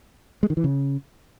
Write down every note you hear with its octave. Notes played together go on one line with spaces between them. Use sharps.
G#3
D#3
E3
C#3